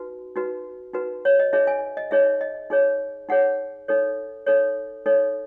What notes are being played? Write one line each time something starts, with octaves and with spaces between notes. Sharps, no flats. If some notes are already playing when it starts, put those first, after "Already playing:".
Already playing: D#4 F#4 B4
D#4 F#4 B4
D#4 F#4 B4
C#5
D#5
D#4 G#4 C#5 E5
G#5
D#5
D#4 G#4 C#5 E5
D#5
D#4 G#4 C#5
D#4 G#4 C#5 F#5
D#4 A4 C#5
D#4 A4 C#5
D#4 A4 C#5